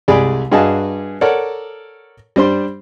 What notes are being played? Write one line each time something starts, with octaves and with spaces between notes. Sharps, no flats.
C2 G#3 G4 G#4 D5 B5
G2 F#4 G#4 D#5 F5 A5
A4 A#4 C#5 D5 F#5
G3 D4 C5 C6